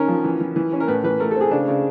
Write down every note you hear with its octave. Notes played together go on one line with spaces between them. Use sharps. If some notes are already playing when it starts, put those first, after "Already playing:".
Already playing: D#3 C#4 A#4
F3
E3
E3
E3
C#4
A#4
A2 B4
E3 B4
A3 A#4
A4
C4 G#4
C#3 D4
C#3